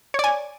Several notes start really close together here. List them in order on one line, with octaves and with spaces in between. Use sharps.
C#5 D5 G#5